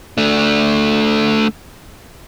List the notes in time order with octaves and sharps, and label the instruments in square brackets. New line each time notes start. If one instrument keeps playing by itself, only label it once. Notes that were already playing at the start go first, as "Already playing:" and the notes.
[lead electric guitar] A3 D4